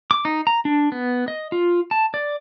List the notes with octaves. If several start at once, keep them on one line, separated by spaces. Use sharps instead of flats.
D6
D#4
A#5
D4
B3
D#5
F4
A5
D5